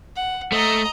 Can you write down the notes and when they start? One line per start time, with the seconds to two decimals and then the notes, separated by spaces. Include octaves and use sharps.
0.16 F#5
0.52 A3 D#5 A#5